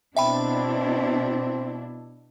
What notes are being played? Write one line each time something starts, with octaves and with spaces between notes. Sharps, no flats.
B2 C4 D4 E4 E5 G5 B5